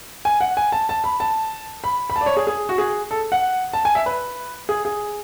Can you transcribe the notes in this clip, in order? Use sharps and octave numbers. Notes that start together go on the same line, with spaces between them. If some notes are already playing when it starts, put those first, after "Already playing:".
G#5
F#5
G#5
A5
A5
B5
A5
B5
B5
A5
D5
C#5
G#4
G#4
F#4
G#4
A4
F#5
A5
G#5
E5
B4
G#4
G#4